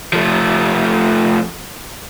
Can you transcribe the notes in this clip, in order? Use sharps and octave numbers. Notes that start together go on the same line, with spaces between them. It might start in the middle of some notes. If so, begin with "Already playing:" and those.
F3 A3